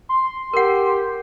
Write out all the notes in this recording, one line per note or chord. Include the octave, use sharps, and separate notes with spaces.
C6
G4 A#4 F#5